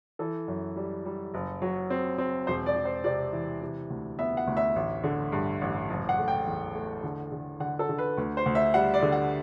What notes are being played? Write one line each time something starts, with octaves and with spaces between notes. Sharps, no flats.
E3 A4
F#2
G3
G3
F#1
F#3
C4
C4
E1 C5
D5
E1
C5
C3 D5
E3
C3
D2
B3 E5
F#5
D2
E5
A1
D3
G2
A1
F#1
F#5
A3
G5
E2
A3
D3
D3
D3 F#5
A4
D3
B4
D2
C5
D2
E5
G3 F#5
D5
D3
F#5